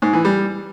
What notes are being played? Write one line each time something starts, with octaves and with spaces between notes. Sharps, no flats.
G#2
E3
G3